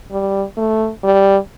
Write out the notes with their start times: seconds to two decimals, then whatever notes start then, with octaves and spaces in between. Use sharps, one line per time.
0.11 G3
0.57 A3
1.04 G3